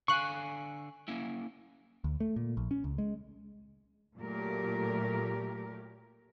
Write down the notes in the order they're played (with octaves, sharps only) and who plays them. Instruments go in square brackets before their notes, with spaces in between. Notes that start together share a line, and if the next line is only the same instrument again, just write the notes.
[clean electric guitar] D3 F5 G#5 [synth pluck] C#6 F#6
[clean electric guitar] A#3 C#4 E4
[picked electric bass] D2
A3
A#2
A#1
C#4
C#2
G#3
[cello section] A#2 F#3 A3 G4 A#4